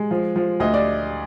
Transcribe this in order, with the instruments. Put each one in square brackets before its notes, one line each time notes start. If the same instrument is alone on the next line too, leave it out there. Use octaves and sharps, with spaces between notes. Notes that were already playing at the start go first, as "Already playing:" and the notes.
Already playing: [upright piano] G#3
F3
F3
D2 D#5
D5